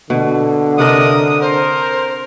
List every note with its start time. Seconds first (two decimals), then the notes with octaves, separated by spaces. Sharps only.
0.10 B2 D3
0.78 C3 D4 A#4 D#5 D#6
1.41 A#4 C5